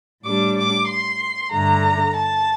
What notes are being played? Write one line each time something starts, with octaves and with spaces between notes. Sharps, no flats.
A2 G3 D4 D6
D6
C6
G2 D3 A3 A#5
A5